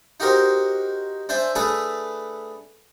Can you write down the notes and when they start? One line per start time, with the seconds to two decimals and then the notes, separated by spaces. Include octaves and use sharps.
0.20 D#4 F#4 G4 A#4 C5
1.29 D4 C5 E5 G#5
1.55 A3 D4 G#4 A4 B4